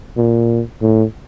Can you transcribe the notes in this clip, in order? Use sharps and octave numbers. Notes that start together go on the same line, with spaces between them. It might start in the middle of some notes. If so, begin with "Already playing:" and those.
A#2
A2